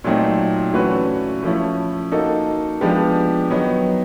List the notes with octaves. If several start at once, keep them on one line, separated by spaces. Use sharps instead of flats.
A#2 F#3 A3 C4 D#4
E3 A3 C#4 F#4 B4
F3 A3 C#4 E4
A#3 D#4 F#4 A4
F3 G#3 B3 D4 G4
D#3 F#3 B3 D#4